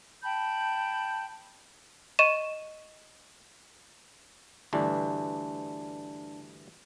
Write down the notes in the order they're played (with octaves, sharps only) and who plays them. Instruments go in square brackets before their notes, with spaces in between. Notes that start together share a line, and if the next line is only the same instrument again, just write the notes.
[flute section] G5 A5 B5 G6
[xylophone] D#5 C#6 D#7 E7
[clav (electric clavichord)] D2 G2 E3 [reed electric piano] D4 D5 A5